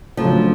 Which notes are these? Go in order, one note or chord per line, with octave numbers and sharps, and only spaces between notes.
C#3 F3 F#3 A3 D4